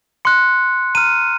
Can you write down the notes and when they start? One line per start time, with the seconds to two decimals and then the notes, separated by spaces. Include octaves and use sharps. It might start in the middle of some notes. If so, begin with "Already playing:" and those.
0.25 C6 F#6 C#7
0.95 A#5 F6 D#7